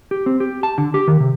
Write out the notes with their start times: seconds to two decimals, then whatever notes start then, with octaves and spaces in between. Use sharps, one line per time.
0.11 G4
0.26 C4
0.40 G4
0.63 A5
0.78 D3
0.94 G4
1.08 D#3
1.20 C3